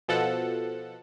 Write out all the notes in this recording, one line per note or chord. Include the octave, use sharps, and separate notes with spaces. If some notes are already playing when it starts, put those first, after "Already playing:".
B2 F3 A4 F#5